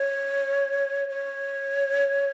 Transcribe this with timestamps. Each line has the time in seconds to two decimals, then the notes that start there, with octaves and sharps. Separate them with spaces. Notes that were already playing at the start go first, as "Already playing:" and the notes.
Already playing: C#5
1.09 C#5